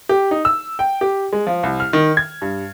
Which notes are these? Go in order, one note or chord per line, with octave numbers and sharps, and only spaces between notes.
G4
D#4
E6
G5
G4
G#3
F3
C2
F6
D#3
G#6
G2